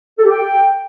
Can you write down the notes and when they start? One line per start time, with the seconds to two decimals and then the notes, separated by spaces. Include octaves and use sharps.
0.18 A4
0.24 G4
0.30 G5